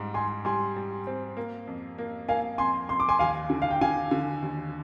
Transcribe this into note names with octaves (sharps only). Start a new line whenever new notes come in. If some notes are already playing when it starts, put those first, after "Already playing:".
Already playing: G#2 G3
G#2 G#5 C6
G3 G#5 C6
G3
C4
A#3
F2
A#3
A#3 F5 G#5
F2 G#5 C6
F2 C6
D6
G#5 C6
D#2 F5 G#5
D3
F5
G5
D3 F5 G#5
D3
D#2